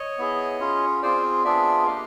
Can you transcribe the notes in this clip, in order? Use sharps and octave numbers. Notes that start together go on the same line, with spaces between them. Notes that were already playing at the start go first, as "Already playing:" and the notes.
Already playing: C#5 D#5
B3 E4 G#4
C#4 F4 G#4
C4 F4 G#4 C5 D5
B3 D4 F4 G#4 D5 E5
A#3 D4 G4 D#5 F5